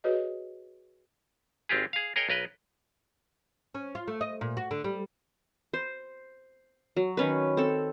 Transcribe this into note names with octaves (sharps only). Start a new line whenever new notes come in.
F#4 G#4 B4 C#5 D#5
G#1 C4 F4 G4 G#4
G#4 F5
G#4 A#4 C#5 D#5 G5
B1 A#4 B4 D#5
C#4
F4
A3
D#5
A#2
F#4
D3
G3
C5
F#3
D#3 C#4 B4
C4 A4